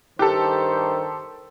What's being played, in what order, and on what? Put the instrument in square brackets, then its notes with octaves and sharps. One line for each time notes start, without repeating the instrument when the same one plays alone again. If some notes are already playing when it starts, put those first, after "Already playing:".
[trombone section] G2 D#3 C5 [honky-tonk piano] G4 A4